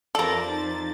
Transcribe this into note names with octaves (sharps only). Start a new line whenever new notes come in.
F2 A4 A#4 C5 D5 A6
D#4